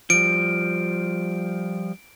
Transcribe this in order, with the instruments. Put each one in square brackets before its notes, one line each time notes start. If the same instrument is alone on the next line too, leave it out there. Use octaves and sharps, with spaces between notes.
[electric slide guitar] F3 G3 [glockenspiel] D7